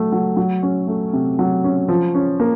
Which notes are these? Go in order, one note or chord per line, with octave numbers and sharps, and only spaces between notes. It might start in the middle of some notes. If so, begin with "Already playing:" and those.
Already playing: F#3 A3
F#3
F#3
C#4
A3
C3
F#3
C#4
F3
C#4
A#3